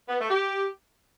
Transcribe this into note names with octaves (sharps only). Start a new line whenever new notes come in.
B3
A3
G4